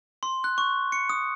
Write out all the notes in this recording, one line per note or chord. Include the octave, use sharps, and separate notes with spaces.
C6
F#6
C#6
C#7
D#6